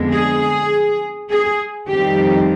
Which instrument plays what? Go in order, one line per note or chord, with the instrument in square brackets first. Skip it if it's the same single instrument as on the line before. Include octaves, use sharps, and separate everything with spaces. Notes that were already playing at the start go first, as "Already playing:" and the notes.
Already playing: [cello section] F2 D3 G#3 B3
G#4
G#4
F2 D#3 G3 C4 G4